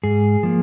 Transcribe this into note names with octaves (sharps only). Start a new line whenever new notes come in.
G#2 G#4
F3 A#3